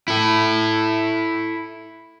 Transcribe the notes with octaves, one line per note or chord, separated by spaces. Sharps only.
E4 A4